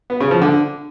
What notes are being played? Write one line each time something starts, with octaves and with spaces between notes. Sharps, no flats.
B3
C#3
F3
D3